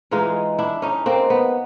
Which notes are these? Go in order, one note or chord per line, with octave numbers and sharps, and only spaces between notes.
G#2 E3 G#3 D#4 F4
D4 E4
C#4 D#4
A#3 C4
B3